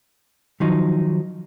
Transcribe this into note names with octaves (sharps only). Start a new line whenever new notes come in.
D#3 F3 F#3 D#4